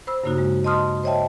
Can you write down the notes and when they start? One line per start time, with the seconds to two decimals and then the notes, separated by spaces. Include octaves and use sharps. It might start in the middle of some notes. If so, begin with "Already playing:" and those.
0.07 C5 B5 E6
0.24 G2 C#3 A#3 D#4 F#4
0.38 G#3
0.64 D#5 A5 C6 D#6 F6
1.04 C5 C#5 D#5 E5 G5 A5